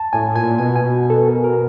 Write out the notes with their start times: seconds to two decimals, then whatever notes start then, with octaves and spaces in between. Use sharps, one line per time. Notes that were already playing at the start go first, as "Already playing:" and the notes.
Already playing: A5
0.13 A2 G#5
0.35 A#2 G#5
0.58 B2 G#5
0.76 G#5
1.10 A4
1.27 A#4
1.44 A#4